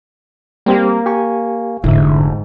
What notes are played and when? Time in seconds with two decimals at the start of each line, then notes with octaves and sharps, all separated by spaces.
0.66 G3 A#3 C4 G4
1.06 G4 G#5 C#6
1.84 F1 G#2 D3 E4 E5